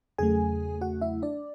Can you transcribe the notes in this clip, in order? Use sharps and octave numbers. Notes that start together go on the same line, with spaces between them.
E2 C#3 F#3 A3 G#4 G#5
F#4 F#5
E4 E5
D4 D5